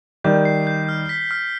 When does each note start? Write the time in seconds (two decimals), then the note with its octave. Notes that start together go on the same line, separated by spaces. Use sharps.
0.24 D#3 G3 G6
0.45 C7
0.67 G6
0.89 F6
1.09 B6
1.31 F6